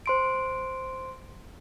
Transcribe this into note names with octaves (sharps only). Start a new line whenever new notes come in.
C5 C6 D7